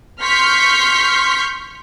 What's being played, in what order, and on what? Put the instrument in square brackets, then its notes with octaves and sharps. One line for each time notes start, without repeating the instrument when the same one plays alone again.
[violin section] C6 C#6 F6 G6 B6